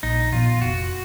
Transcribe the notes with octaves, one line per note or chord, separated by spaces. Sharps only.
A#1 D#4
A#2 F3 B3 F4
F1 F#4